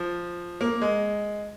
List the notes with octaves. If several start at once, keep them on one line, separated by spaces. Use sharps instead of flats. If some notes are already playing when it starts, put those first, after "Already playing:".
Already playing: F3
A#3
G#3